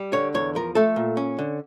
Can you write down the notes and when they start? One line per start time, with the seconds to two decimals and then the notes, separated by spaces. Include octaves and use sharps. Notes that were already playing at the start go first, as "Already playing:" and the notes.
Already playing: G3
0.13 D3 C#5
0.34 E2 C#5
0.55 F3 A#4
0.75 A3 A4
0.96 A#2
1.17 C#4
1.39 D3